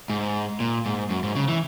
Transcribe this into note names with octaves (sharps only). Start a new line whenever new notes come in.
G#2
A#2
G#2
F#2
G#2
C#3
E3